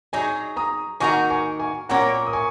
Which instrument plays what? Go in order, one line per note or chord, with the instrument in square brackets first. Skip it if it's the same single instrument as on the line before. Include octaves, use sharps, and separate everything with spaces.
[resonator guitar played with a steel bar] F#3 D#4 G#4 [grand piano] G#5 C#6
[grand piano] A#5 D#6
[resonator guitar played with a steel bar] D#3 A#3 D#4 F#4 A#4 [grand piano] G#5 C#6
[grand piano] G#5 C#6
G#5 C#6
[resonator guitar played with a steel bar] A#2 F#3 A#3 C#4 A#4 [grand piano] F#5 A#5
[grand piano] D#6
G#5 C#6